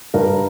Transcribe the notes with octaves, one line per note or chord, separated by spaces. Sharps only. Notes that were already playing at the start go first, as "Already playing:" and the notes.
G2 A#4